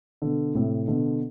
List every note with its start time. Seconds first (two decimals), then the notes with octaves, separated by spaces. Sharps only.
0.22 B2 D3
0.55 A2 C3
0.88 B2 D3